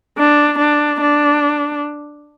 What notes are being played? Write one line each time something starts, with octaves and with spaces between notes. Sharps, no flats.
D4
D4
D4